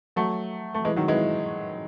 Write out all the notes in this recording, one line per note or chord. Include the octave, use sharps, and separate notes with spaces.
F#3 A3
A3
E3 G#3
D#3 F#3
E3 G#3